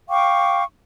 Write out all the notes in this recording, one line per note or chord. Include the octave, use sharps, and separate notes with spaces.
F5 G5 C#6 D6